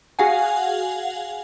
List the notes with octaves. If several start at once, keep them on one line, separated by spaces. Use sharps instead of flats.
F#4 G#4 F5 F#5 G#5